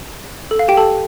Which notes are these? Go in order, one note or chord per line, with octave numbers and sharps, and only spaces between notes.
A4
F5
G4 G5
A4 A5